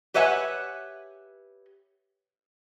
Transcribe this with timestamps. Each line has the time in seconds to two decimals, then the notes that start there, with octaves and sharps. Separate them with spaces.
0.14 G4 B4 C#5 E5 F#5 G#5